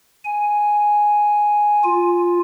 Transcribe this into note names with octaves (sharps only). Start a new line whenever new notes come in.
G#5
F4